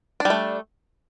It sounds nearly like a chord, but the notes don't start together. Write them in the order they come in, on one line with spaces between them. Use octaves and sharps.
D4 G3 A3